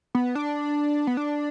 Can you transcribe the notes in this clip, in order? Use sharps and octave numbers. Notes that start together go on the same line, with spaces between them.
B3
D4
B3
D4